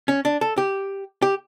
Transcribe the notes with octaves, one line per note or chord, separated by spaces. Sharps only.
C#4
D4
A4
G4
G4